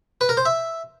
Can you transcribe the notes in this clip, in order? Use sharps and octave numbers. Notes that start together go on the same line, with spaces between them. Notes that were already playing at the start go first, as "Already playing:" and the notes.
B4
A#4
C5
E5